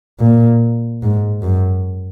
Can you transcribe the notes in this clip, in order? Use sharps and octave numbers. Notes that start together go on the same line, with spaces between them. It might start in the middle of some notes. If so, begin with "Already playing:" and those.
A#2
G#2
F#2